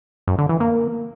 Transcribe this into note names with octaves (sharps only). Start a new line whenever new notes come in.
F#2
D3
E3
A#3